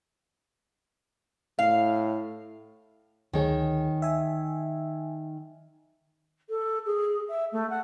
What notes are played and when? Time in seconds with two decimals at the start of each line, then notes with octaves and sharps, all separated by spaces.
1.59 A2 F5
3.33 D2 D#3 G#4 C#5
4.02 E5 G#5
6.50 A4
6.86 G#4
7.29 E5
7.52 A3
7.70 F#5